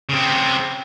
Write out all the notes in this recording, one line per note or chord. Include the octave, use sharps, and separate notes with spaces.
C#3 C4